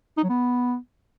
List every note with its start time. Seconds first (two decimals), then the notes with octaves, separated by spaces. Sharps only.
0.17 D#4
0.23 F#3
0.29 B3